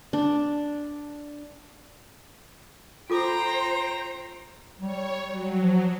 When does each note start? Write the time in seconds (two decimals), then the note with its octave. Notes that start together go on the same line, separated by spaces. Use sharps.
0.13 D4
3.10 F4 A4 C5 G5 A#5 D6
4.80 G3 C#5
5.28 F#3
5.60 F3